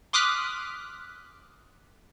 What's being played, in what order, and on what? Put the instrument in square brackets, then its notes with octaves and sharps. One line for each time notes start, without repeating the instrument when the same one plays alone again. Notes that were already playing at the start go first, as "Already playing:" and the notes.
[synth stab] C6 D6 D#6 F6 F#6 B6